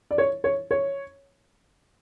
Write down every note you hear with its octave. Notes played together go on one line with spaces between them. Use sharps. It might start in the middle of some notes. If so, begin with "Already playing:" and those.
D5
C#5
C#5
C#5